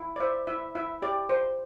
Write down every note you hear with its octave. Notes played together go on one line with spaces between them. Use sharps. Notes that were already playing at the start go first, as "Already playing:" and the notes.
Already playing: E4
D5
C5 E5
E4 E5
E4 E5
G4 D5
C5